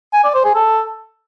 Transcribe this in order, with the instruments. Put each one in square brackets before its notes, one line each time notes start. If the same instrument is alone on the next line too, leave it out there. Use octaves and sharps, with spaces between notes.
[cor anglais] G#5
D5
C5
G#4
A4